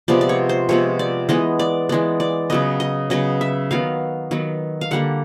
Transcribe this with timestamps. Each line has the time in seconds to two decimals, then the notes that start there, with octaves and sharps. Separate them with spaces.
0.08 C3 F3 G#3 B3 D5
0.21 D5
0.29 C#5
0.49 C5
0.69 C3 F3 G#3 B3 C#5
0.99 D5
1.29 E3 G#3 B3 D#5
1.59 D5
1.89 E3 G#3 B3 D5
2.20 D5
2.50 C#3 F#3 B3 D#5
2.80 D#5
3.10 C#3 F#3 B3 D#5
3.41 E5
3.71 D#3 F#3 B3 F5
4.31 D#3 F#3 B3
4.81 F5
4.91 D3 G3 A#3 F#5